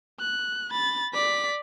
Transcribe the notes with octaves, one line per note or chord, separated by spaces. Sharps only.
F#6
B5 A6
D5 B6